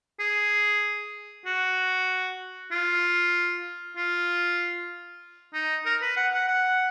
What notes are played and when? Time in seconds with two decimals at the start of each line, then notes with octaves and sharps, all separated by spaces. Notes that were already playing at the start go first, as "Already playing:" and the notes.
0.20 G#4
1.46 F#4
2.72 F4
3.97 F4
5.54 D#4
5.86 A#4
6.02 B4
6.17 F#5
6.33 F#5
6.48 F#5